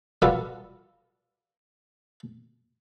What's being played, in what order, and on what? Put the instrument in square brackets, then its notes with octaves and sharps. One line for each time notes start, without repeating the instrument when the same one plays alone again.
[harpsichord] G3 F4 F#4 A4 B4